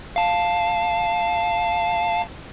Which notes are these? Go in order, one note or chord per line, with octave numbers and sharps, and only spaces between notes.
F5 A5